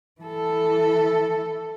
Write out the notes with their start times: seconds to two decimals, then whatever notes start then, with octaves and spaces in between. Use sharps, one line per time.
0.22 E3 A4